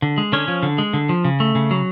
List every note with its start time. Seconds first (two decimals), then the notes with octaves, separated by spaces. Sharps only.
0.02 D3
0.18 G#3
0.32 D3 C#4 C#5
0.48 F3
0.63 D3
0.78 G#3
0.93 D3
1.09 F3
1.24 C#3
1.40 A3
1.55 C#3
1.71 F#3